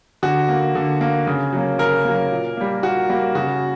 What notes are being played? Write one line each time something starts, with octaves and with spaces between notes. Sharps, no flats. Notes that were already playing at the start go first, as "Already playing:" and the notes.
D3 F#4
A#3
D3
A#3
C#3
F#3 A#3
C#3 A#4
F#3 A#3
A#2
G3 A#3
A#2 F#4
G3 A#3
C#3 F#4